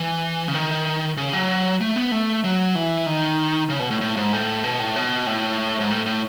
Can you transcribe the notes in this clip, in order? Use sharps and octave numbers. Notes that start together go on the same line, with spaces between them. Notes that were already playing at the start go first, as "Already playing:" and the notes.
Already playing: E3
C#3
D#3
C#3
F#3
A3
B3
A3
F#3
E3
D#3
C#3
B2
A2
A2
G#2
A2
B2
A2
B2
A2
G#2
A2
A2